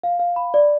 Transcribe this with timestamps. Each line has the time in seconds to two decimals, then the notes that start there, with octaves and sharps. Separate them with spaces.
0.04 F5
0.19 F5
0.36 B5
0.54 D5